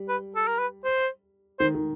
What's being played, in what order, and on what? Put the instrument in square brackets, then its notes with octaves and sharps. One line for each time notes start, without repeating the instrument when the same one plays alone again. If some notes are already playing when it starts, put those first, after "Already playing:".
Already playing: [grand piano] G3
[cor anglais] B4
A4
A#4
B4
C5
[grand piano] D#3 [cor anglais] C5
[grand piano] D#3